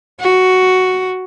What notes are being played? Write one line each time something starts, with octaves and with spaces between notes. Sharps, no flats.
F#4